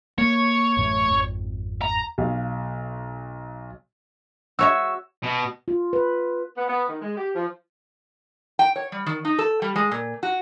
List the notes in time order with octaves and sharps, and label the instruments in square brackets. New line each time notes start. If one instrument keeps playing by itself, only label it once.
[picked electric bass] A#3 [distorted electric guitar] C#5
[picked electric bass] A1 F#2 A3
G#1 F2
[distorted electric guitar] A#5
[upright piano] B1 F5
[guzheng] F#4 C#5 E5 [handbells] E6
[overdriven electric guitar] B2
[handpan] F4
B4
[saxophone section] B3
B3
D#3
G#3
G4
F3
[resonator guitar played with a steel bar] G5
C#5
G3
D#3
D#4
A4
G3
G#3
A#2
F#4